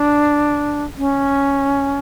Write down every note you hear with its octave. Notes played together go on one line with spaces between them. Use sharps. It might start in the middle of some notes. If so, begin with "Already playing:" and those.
Already playing: D4
C#4